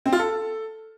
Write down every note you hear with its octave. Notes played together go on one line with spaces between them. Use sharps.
C4
F4
A4